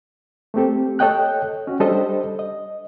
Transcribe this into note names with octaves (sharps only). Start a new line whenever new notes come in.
A3 A#3 C4 G4 A4
A4 C#5 D#5 G5 F#6
C#4 F#4
G3 D4 G4 A4 C5 D#5
D#5